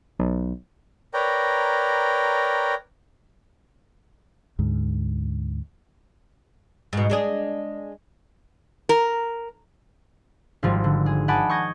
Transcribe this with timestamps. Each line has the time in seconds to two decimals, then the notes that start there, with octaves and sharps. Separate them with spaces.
0.19 B1
1.14 A#4 B4 C#5 D5 G5 A#5
4.59 D2 G#2
6.93 G#2 B2
7.10 G#3 D4 G#4
8.89 A#4
10.63 G#1 F3 G3
10.84 D3
11.06 G#4
11.28 D#5 F#5 G#5 A5 B5 D6
11.49 C#6 D#6 G6 G#6 A#6